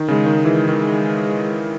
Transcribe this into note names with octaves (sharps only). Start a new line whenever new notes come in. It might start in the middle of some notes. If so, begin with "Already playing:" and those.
Already playing: D#3
C#3 G#3
D#3
E3 G#3
D#3